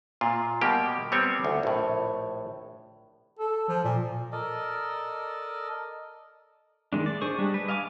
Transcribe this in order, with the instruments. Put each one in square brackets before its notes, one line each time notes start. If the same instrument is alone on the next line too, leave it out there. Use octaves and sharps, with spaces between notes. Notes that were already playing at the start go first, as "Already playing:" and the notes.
[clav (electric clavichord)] A#2 F4
B2 G3 A#3 G4
G3 B3 C4 C#5
D2
A#1 A2
[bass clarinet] A4
F3
A#2
[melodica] A4 A#4 D5 D#5
[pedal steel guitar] D#3 G#3 D4
D5
D4 G#4 C5 C#6
G3 G#3 D4
B4
D#5 F5 G#5 D6